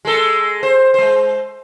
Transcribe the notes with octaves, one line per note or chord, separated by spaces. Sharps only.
G#3 A4
C5
G#3 C5